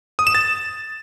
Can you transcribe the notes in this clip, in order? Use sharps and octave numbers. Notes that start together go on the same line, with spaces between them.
D#6
E7
A6